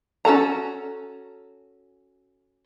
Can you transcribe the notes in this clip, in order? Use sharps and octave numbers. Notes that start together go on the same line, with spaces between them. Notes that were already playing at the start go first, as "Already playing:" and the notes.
C#4 F#4 A4 A#5